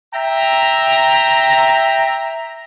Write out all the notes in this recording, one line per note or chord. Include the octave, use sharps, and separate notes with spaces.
E5 G5 A#5